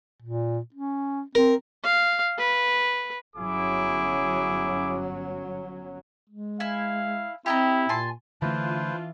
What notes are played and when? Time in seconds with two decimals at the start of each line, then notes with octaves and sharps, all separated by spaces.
0.22 A#2
0.74 C#4
1.35 C4 A#4
1.83 F5
2.38 B4
3.36 G1 F#3 C#4 E4 G#4 D6
6.30 G#3
6.60 E4 F5 G#5
7.46 C4 E4 G4 D#5 A#5
7.89 A#2 G#5 A5 C6
8.42 D3 E3 A3 D4 F4 B4 C5